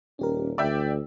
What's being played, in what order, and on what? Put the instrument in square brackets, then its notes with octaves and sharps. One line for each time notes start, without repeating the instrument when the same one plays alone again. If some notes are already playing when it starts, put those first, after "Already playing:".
[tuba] D#1 [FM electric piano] C#4 G4 A#4
[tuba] D2 [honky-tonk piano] D5 E5 G5 [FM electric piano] E6